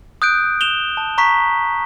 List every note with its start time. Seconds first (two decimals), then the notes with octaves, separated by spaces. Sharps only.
0.22 D#6 F#6 G6 D7
0.61 E7 F7 G7
0.97 A5
1.18 A#5 C#6 B6